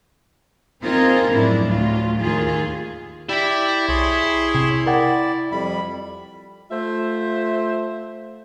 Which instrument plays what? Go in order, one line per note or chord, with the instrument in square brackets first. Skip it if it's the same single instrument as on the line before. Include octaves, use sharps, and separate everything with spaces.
[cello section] A#3 C4 D#4 F4 G#4 A#4
F#2 A2 F3 D4 E4
D2 A2 F#3 F4
D#2 D#3 F4 G#4
[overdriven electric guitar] E4 E5 [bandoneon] G4 D5
[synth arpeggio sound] B1 [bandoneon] G#4 C#5 C6
[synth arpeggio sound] C3
[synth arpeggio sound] A#4 F#5 G5 [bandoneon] D5
[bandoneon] F2 G3 B5
[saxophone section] A3 F4 C5 E5